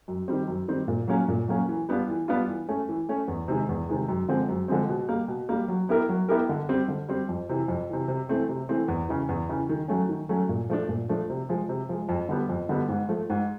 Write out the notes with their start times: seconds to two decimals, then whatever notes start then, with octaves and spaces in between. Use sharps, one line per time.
0.08 F#2
0.28 D#3 G3 C4
0.48 F#2
0.68 D#3 G3 C4
0.88 A#2
1.08 F#3 A#3 C#4
1.28 A#2
1.48 F#3 A#3 C#4
1.69 E3
1.89 G3 B3 D4 F4
2.09 E3
2.28 G3 B3 D4 F4
2.48 E3
2.69 A3 C#4
2.89 E3
3.09 A3 C#4
3.28 E2
3.48 C3 D#3 G#3
3.69 E2
3.89 C3 D#3 G#3
4.08 F#2
4.29 D3 F3 G#3 C4
4.49 F#2
4.68 D3 F3 G#3 C4
4.89 B2
5.08 G3 A#3
5.28 B2
5.49 G3 A#3
5.68 F#3
5.89 B3 E4 G4 A#4
6.09 F#3
6.29 B3 E4 G4 A#4
6.49 D3
6.69 G3 C4
6.88 D3
7.09 G3 C4
7.29 F2
7.49 C3 E3
7.68 F2
7.89 C3 E3
8.08 C3
8.29 E3 A3 C4
8.49 C3
8.69 E3 A3 C4
8.88 E2
9.08 C#3 E3
9.29 E2
9.49 C#3 E3
9.69 D#3
9.88 F#3 A3 C#4
10.09 D#3
10.29 F#3 A3 C#4
10.49 A#2
10.70 F3 A3 D4
10.89 A#2
11.09 F3 A3 D4
11.30 C3
11.49 F3 G#3
11.69 C3
11.89 F3 G#3
12.09 F2
12.29 D3 G3 B3
12.49 F2
12.69 D3 G3 B3
12.89 G#2
13.09 F3 A3
13.30 G#2